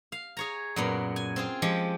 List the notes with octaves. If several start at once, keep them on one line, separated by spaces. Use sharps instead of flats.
F5
G#4 C#5 A#5
F#2 A#2 B3
G#5
C4 F4 G#4
F3 G#3 G4